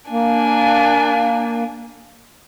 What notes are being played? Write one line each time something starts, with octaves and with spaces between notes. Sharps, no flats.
A#3 D4 G#5